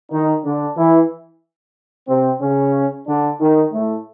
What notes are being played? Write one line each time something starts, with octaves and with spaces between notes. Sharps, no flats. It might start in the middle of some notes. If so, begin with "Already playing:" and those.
D#3 D#4
D3 D4
E3 E4
C3 C4
C#3 C#4
D3 D4
D#3 D#4
A2 A3